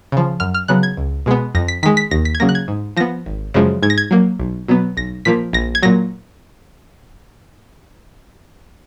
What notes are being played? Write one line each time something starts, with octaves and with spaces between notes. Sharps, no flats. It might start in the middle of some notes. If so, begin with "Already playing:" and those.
C#3 F3
F#2 F6
F6
C#3 F#3 B3 F#6
G#6
C#2
B2 G#3 B3
F2 A#6
B6
D#3 G#3 B6
B6
D#2 A#6
B6
G#6
C#3 F#3 A#3 A#6
F#6
G#6
G#2
F3 B3 A#6
G#1
F#2 C#3 F3 G#3
G#2 G#6
A#6
G#6
F#3 A#3
B1
B2 F#3 B3
B1 A#6
A#2 F3 A#3 B6
A#1 A#6
G#6
A#2 F#3 A#6